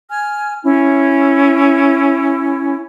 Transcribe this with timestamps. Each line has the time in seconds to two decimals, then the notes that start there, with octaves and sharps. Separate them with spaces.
0.08 G#5 F6
0.63 C#4 E4